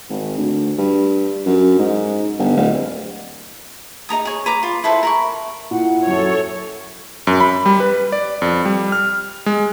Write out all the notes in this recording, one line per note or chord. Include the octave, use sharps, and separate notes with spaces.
G#1
D2
G2
F#2
G#2
G1
D1
D#4 A#4 A#5 D#6
G#4 C#5
B4 A#5 D6
F4
E4 A4 B4 C5
A#4 B5 C#6
A#2 E4 F#5
F#2 F#3 A4 C#5
F#2
B5
G3
B4
D5
F2
G3
F6
G#3